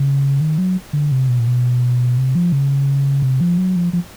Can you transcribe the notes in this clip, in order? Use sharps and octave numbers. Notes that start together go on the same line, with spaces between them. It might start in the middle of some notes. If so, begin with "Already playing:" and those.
Already playing: C#3
D#3
F#3
D3
C3
B2
A#2
B2
C3
F3
C#3
C3
F3
F#3
F3
F3